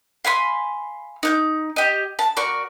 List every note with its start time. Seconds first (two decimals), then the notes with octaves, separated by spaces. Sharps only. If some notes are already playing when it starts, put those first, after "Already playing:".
0.25 F5 G#5 B5 C6
1.23 D#4 F#6 G6
1.76 G4 D#5
2.19 A5
2.37 A#3 F#4 D5 C#6